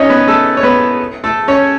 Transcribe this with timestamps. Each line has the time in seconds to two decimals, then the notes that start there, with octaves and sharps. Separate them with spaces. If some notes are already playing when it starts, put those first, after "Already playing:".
Already playing: C#4 D#4 C#5 D#5
0.10 B3 B4
0.28 A3 A4
0.57 C#5
0.63 B3 B4
1.24 A3 A4
1.48 C#4 C#5